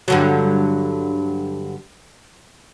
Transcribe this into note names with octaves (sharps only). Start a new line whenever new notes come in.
G2 D3 F#3